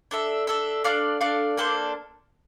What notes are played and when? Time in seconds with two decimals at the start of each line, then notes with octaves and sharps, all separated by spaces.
0.11 D4 A4 E5
0.47 D4 A4 E5
0.84 D4 A4 D5 F5
1.21 D4 A4 D5 F5
1.57 A#3 D4 A4 C5